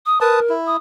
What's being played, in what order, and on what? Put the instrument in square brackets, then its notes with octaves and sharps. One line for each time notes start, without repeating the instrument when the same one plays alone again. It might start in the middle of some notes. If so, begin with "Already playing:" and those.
[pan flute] D#6
[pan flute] A#4 [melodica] B4 A5 D#6
[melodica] E4
[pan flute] D#6